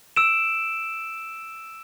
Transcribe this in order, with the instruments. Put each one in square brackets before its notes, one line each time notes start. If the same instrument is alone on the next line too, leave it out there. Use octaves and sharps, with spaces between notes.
[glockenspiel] E6 D7 E7